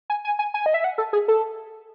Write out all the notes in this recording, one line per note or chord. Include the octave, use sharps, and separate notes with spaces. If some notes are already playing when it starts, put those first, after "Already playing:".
G#5
G#5
G#5
G#5
D#5
E5
F#5
A4
G#4
A4